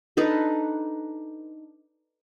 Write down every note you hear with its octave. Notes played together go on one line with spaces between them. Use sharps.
D4 D#4 A4 B4